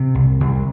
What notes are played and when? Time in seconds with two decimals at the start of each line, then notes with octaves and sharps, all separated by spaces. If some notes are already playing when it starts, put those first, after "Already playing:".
Already playing: C3 C4
0.15 C2
0.40 C2